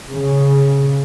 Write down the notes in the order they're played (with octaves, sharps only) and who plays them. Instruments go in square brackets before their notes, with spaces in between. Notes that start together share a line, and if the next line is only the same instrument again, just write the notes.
[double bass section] C#3